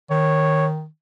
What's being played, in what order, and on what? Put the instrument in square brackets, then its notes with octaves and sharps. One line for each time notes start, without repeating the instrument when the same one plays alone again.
[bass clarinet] D#3 [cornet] C#5